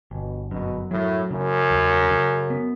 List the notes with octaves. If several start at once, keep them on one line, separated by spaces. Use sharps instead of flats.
G1 B2
F#2 B2
A2 F#3
F#2 C#3
E2
C#3
B3